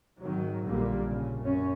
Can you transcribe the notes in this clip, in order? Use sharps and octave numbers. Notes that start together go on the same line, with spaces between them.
G#1 G#2 D#3 F#3
A#1 A#2 D3 G3 A#3
C#3
F#2 C#4